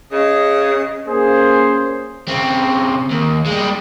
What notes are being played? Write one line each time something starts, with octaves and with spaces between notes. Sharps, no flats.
C#3 D#5
A#3 C#4 G#4 C5
C#3 C4
D#2
G3 G#3